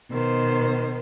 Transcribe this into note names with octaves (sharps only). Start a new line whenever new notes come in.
B2 D#3 C5